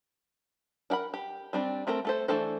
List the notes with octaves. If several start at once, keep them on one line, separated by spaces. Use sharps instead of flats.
D4 A#4 F#5 B5
G4
G3 C4 D4
A3 C4 A4 A#4
A3 A4 C5
E3 A3 D4 A4 C5